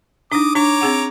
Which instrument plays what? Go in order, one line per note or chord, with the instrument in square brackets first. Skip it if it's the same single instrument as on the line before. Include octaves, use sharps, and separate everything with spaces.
[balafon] D4 D#4 [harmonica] D6 D#6
[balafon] D4 [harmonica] C#5 A#5 D6
[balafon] C4 G#4 F#5